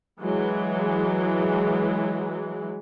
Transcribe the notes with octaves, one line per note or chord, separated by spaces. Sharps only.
E3 F#3 G#3